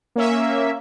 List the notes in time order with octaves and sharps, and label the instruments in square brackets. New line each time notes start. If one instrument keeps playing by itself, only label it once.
[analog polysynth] A#3 C#4 E5